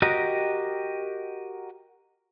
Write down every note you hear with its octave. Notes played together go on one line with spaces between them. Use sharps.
F#4 G4 A#4 D#5